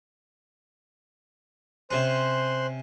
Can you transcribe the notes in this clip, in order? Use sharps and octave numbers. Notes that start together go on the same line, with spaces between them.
C3 C#4 C5 C6 F#6